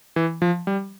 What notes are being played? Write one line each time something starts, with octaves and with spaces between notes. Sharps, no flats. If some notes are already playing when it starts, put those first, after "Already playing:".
E3
F3
G3